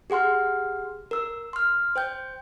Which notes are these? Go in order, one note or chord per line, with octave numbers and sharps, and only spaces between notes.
G4 G#4 F#5 C6 F6
A#4 E6
C6 F6
C5 G5 G6